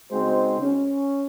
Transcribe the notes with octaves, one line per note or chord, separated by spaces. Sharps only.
C#3 G#3 C4 D#4 F#4 C5
C#4